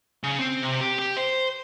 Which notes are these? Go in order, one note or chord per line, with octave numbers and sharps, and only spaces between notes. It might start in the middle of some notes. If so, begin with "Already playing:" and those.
C#3
C4
C3
G4
G4
C5